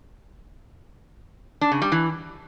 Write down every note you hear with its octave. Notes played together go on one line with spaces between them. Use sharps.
D4
C#3
G3
E3